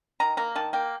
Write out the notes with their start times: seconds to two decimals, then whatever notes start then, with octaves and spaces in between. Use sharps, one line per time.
0.20 D#3 A#5
0.37 A#3 A#5
0.55 D#3 A5
0.73 A#3 G5